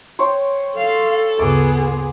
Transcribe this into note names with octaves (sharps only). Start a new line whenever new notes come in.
C5 C#5 G5
A4 F5
D2 G2 C#3 B3 G#4 D6